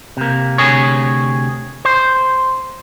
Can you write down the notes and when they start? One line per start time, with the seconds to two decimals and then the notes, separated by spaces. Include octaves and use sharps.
0.17 C3 A#3
0.58 D2 G2 C3 G#4 C#5
1.85 C5